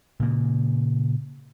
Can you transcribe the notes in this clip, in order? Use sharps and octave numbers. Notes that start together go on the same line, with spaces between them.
A#2 C#3 A#3